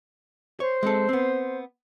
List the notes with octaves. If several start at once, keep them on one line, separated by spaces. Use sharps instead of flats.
C5 C#5
G#3 C4 A4
B3 C4